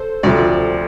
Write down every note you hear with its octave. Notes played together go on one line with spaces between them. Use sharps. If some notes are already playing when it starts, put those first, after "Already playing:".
Already playing: A4 C5
D2 C3 F3 D5